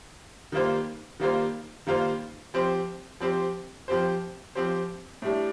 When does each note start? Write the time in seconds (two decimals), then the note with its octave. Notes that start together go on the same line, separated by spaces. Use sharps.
0.52 D#3 G3 A#3 F4 C5
1.20 D#3 G3 A#3 F4 C5
1.87 D#3 G3 A#3 F4 C5
2.54 F3 C4 G4 C5
3.20 F3 C4 G4 C5
3.88 F3 C4 G4 C5
4.55 F3 C4 G4 C5
5.22 A2 G3 D4